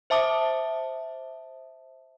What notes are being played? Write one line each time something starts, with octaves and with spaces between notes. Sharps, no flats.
C5 E5 A5 D6 D#6